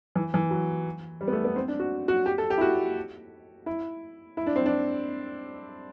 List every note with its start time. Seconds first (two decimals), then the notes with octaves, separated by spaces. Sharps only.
0.16 E3
0.34 E3
0.51 F#3
1.21 G3
1.28 B3
1.33 A3
1.45 B3
1.56 C4
1.68 D4
1.80 F#4
2.08 F#4
2.26 G4
2.38 A4
2.50 G4
2.58 E4
2.61 F#4
3.66 E4
4.37 E4
4.46 D4
4.56 C4
4.66 D4